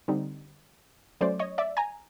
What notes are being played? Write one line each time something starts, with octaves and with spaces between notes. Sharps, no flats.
D3 G3 C4 D#4
F#3 A3 C#4 C5 D5
C#5 D#5
D5 E5
G#5 A#5